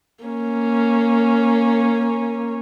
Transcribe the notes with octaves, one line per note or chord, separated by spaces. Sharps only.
A#3 C#4